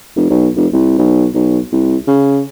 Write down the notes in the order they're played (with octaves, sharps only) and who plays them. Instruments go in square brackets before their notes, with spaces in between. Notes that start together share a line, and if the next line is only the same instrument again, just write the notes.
[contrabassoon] F1
B1
F1
C2
B1
B1
C2
C#3